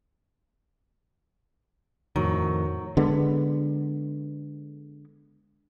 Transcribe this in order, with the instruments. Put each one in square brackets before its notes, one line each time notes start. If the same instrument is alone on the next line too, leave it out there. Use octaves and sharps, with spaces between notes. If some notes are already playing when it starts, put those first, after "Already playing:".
[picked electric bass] F2 A2 D#3 [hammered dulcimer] F#3
[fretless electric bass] D3 G#3 B3